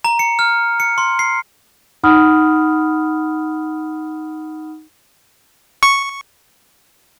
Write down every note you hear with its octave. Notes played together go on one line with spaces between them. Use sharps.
A#5
C#7
F6
C#7
C6
C7
D#4 F#5 B5 D#6 F6
C#6